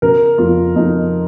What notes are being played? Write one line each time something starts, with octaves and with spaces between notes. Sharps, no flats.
C#3 A#4
F2 F4
F2 D#4